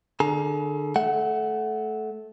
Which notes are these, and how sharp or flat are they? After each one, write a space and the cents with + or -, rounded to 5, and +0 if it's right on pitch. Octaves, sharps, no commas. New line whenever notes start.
D3 +30 G#4 +40 A#5 +15
A3 -20 F#5 +0